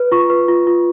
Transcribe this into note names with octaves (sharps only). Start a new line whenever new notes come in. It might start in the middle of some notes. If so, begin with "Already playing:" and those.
Already playing: B4
F4 C#6
B4
F4
F4